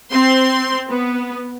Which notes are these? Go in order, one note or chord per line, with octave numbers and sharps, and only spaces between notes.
C4 C6
B3